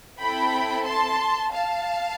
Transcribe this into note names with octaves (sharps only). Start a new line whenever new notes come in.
C4 E4 A4 G5 B5
A5 C6
F5 A5